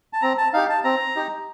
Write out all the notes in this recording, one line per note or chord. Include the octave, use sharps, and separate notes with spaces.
A5
C4 A#5
A5
D#4 G4 F5
A5
C4 A#5
D#4 G4